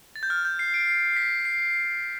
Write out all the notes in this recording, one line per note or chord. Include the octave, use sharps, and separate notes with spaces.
A6
G6
F6
G6
C7
D7
C7
C7
B6
C7